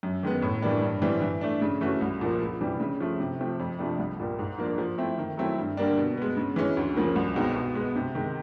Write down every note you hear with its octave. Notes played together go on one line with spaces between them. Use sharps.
F#2
D#3 G#3 B3
A2
E3 G3 A#3 D4
G2
E3 G3 C4
E3
A3 D4
C#3
E3 A3 C#4 F#4
C2
A#2 F3 A#3
C#2
C3 E3 G3
C#3
F3 A3
C3
F3 A3 C4
F2
C3 F3 A3 D4
C2
A#2 G3 A#3
G#2
F3 A#3 D4
F3
A3 C4 E4
D#3
F#3 A3 C4 E4
G2
D3 G3 A#3 D4
B2
G#3 B3
C#3
E3 G#3 C#4
D2
C#3 F3 A#3
C2
B2 G#3 C4 D#4
B2
G#3 B3
C3
D#3 G#3